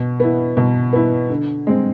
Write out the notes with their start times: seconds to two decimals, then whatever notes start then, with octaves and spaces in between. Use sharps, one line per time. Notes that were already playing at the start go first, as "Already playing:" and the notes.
Already playing: B2
0.20 B3 E4
0.57 B2
0.93 B3 E4
1.30 D3
1.67 G#3 C4